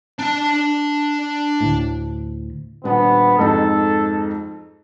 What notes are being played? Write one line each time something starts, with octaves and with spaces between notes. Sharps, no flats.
D4 A5
D2 A2
D#1 B3 D4
F2 G#2 D#4 A4